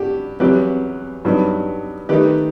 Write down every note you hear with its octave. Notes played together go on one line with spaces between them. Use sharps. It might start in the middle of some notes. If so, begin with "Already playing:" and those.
Already playing: G2 F#4 G4
E2 C3 F#3 B3 G4 B4
G2 F#3 B3 D#4
D#3 A3 D#4 G4 B4